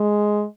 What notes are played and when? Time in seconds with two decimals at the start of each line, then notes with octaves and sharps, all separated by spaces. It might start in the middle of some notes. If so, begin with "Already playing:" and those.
Already playing: G#3